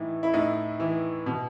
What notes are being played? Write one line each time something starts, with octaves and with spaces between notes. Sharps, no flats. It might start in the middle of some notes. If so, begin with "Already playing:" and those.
Already playing: A2 E3 D#4
E4
A2 D#4
E3
B2